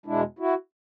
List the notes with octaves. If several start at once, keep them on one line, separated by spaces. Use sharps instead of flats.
E2 B2 G#3 D4 E4
E4 F#4